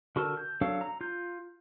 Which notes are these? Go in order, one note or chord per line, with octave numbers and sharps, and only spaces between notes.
D3 F#4 A4 A#4 A5
G6
F#3 D4 A4 C#5 F5
A#5
F4 G6